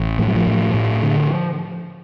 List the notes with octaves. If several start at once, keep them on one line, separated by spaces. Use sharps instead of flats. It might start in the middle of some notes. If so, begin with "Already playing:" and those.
Already playing: A1
A2 F3
F#3
F3
A2
A2
D3